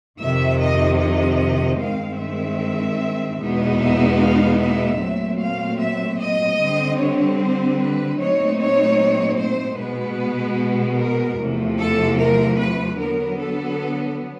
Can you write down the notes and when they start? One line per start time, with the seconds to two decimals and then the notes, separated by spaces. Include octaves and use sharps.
0.20 F2 C3 D#3 E5
0.60 D#5
0.99 D#5
1.80 G2 D#3 G#3 C4 F5
2.19 E5
3.39 E2 B2 G#3 B3 D#4
3.80 E5
4.19 F5
4.59 E5
5.00 A#2 F#3 A3 C4
5.39 F5
5.79 E5
6.19 D#5
6.59 D3 G3 C4
6.99 C#5
7.39 C5
7.79 B4
8.19 A#2 F#3 A3 C4 D#4 C#5
8.59 C#5
9.38 C5
9.78 B2 G#3 B3 B4
10.99 A#4
11.39 E2 C3 F3 A3
11.79 A4
12.18 A#4
12.58 B4
12.98 D3 F#3 B3 A#4
13.38 A4